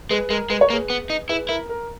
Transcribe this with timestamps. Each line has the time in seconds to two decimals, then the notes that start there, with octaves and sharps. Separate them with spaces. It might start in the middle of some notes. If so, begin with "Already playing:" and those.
0.11 G#3 G#4 B4
0.30 G#3 A#4
0.50 G#3 B4
0.61 C#5
0.70 A#3 G#4 B4
0.90 B3
1.10 D#4
1.29 E4 G#4 B4
1.49 E4 A#4
1.69 A#4